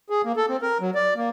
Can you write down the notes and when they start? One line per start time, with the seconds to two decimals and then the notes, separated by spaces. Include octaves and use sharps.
0.10 G#4
0.24 A#3
0.36 A4
0.48 C4
0.62 A#4
0.81 F#3
0.95 D5
1.16 A#3